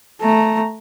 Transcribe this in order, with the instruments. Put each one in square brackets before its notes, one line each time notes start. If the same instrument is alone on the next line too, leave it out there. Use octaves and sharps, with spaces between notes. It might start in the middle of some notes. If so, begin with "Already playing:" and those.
[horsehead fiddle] A3 A#5